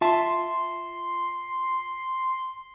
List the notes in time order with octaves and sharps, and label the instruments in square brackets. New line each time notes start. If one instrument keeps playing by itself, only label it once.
[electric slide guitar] F4 E5 A5 [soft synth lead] C6